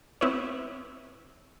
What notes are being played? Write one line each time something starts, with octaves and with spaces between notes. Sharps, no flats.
B3 C4 E4 B4 C#5